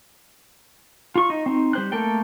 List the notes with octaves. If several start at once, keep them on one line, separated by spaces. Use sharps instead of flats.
F4 C#6
D#4
C4 D#4
G3 C5 F#6
A3 A#3 A4 A#4 G5